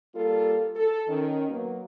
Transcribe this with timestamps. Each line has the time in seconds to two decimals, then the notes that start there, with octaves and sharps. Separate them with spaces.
0.15 G3 A#3 F4 A4
0.76 A4
1.08 D#3 C#4
1.48 F#3 A#3 B3